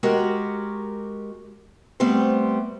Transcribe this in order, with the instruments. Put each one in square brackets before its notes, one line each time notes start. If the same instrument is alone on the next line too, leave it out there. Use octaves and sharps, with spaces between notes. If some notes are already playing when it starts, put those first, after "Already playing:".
[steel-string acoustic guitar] G#3 F#4 G4 A#4
G3 A3 B3 C4 C5